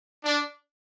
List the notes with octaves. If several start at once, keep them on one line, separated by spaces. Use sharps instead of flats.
D4